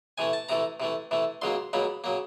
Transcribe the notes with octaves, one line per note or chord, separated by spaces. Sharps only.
C3 E3 A3 G#5
A5
C3 E3 A3 A#5
C3 E3 A3
C3 E3 A3
C#2 C#3 F#3 A#3 C6
C#2 C#3 F#3 A#3 B5
C#3 F#3 A#3